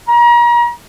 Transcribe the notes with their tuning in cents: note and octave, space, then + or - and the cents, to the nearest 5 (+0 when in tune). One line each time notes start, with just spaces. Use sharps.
A#5 +35